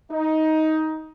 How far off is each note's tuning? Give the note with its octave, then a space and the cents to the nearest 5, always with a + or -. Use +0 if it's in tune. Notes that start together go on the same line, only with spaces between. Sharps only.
D#4 +15